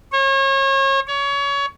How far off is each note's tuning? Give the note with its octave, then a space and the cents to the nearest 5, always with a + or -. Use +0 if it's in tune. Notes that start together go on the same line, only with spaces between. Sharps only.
C#5 -35
C#5 +25